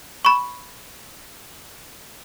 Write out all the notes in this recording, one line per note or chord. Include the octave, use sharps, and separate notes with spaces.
B5 C#6